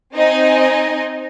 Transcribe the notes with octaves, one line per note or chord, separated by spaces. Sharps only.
C4 D#4 D#5 G#5